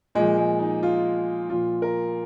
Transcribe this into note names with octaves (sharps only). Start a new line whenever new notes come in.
A#2 F3 G#3
G#3
D#4
F4
A#2 F3 F4
A#4